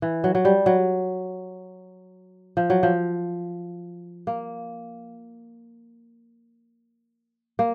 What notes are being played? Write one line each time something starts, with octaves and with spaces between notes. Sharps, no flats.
E3
F#3
F#3
G3
F#3
F3
F#3
F3
A#3
A#3